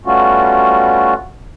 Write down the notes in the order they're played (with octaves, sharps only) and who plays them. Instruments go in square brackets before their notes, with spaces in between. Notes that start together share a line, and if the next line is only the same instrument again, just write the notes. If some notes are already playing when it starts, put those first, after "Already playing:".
[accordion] G3 A3 B3 C#4 F4 F#4